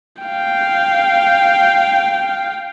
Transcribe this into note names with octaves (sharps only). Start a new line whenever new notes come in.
F5 G5